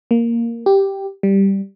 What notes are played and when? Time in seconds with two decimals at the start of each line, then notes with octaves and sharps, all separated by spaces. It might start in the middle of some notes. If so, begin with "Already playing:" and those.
0.11 A#3
0.66 G4
1.23 G3